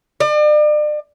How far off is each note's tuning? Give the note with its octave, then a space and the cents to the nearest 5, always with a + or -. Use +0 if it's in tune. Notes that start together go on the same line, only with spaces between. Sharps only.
D5 +40